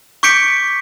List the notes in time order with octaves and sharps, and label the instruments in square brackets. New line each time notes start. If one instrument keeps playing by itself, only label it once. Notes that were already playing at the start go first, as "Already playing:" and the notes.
[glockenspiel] C#6 D6 G6 B6 C#7 D7